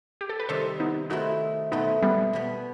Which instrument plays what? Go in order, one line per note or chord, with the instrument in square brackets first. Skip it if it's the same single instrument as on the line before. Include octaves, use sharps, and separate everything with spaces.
[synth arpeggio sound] G4
A4
B4
[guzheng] C3 D#3 G3 [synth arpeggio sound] A4 C5
[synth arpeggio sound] B3 D#4
[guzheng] D#3 A3 C4 E4 [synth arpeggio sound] D#4 F#4
[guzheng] B2 A3 C4 E4 [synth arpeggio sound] B3 D#4
[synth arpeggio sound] G3 B3
[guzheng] B2 G3 B3